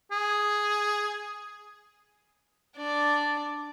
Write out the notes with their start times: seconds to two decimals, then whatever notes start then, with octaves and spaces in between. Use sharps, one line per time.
0.11 G#4
2.77 D4 D5